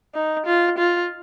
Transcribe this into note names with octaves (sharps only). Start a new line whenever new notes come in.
D#4
F4
F4